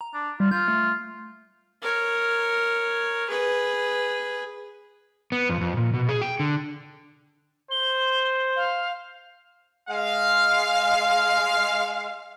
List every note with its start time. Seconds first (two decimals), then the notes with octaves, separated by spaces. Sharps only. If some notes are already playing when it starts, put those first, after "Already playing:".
0.01 A#5
0.14 D4
0.40 G3 F4
0.51 F4 G6
0.68 A3
1.82 A#4 C#5
3.28 G#4 B4
5.32 B3
5.49 F2
5.61 F2
5.77 A#2
5.93 B2
6.09 G#4
6.22 G5
6.40 D3
7.71 C5 G7
8.56 F5
9.89 G#3 F5